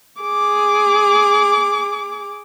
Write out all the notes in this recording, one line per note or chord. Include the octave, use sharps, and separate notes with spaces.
G#4 D6